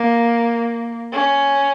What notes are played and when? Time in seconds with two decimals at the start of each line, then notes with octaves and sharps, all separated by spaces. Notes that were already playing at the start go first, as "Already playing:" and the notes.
Already playing: A#3
1.13 C#4